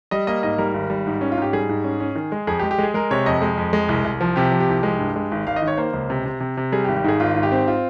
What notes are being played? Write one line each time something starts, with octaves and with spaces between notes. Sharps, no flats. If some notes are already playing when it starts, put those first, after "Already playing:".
G3 D#5
A#3 D#5
G#2 D#5
G3 A#4
G#1
G3
G#2
C#4
F4
G#2 G4
G3 G#4
G#2
C#4
C#4
D#3
G#3
F2 G#4
G4
G#3
G4
G#3 G#4
G#3 A#4
C3 C#5
F2 D#5
G#3
F2
G#3
C2
C2
F3
C3 G4
F3
G4
C2
G#3
G2
G#3
G#1
G#1 F5
D#5
D#3
C#5
A#3 C5
C#2
C3
C3
C3
C3
G3 G#4
G4
G#1
G4
G#2 G#4
G#1 F4
G#2 F4
G4
C4
F4